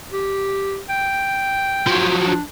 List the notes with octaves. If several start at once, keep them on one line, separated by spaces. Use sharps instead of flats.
G4
G5
F3 F#3
D4